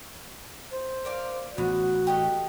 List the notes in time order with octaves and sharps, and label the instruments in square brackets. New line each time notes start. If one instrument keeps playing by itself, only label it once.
[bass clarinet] C5
[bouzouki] A#4 D5 F5
[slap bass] A1 [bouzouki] B3 [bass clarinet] F#4
[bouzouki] G4 A4 D#5